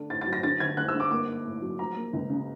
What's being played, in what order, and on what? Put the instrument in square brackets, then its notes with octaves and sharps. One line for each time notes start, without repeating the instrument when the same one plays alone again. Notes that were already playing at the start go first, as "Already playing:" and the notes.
Already playing: [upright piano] D3 A3 D4
A2 A6
A6
F#3
A#6
D3 A6
G1 G#6
G1 F#6
E6
G2
D6
A#3 D6
D#4
A2
F#3
F3 A#5
A#3
C#2
C#3